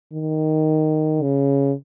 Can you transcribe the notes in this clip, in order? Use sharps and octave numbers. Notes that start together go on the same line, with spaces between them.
D#3
C#3